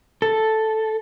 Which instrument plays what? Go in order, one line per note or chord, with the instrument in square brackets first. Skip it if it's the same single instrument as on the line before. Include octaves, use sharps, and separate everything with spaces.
[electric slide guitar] A4